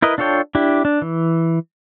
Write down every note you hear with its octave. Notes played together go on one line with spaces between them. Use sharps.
E4 A#4 B4 D#5
D4 F4 A4 C#5 G5
D4 E4 G4
D4
E3